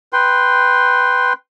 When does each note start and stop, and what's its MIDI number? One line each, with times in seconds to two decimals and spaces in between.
0.13 1.33 71
0.13 1.33 79
0.13 1.33 84